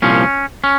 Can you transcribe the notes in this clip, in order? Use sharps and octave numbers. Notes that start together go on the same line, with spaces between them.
C2 A#2 F3 C#4
C#4